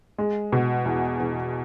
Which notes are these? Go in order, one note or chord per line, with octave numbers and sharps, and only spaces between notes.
G#3
B2
E2
E2